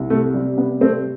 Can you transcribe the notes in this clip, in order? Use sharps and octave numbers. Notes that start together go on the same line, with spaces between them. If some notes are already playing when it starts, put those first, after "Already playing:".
Already playing: C2
C3 A3
G3
C3 B3
G3 A3 C4